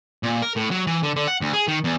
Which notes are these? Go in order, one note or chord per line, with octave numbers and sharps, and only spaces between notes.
A#2
A#4
A2
F#3
E3
D3
D3
F#5
D2
G#4
D#3
E2